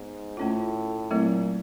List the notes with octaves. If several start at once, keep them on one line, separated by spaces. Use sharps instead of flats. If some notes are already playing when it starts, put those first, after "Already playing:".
Already playing: G#2 B3
A2 A3 C#4 F4
A#2 F#3 A3 C4 E4